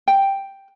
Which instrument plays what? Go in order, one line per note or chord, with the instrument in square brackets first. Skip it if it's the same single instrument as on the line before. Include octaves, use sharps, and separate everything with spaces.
[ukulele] G5